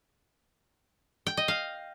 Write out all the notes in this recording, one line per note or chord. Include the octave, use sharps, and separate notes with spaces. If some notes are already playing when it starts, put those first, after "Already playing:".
G5
D#5
F5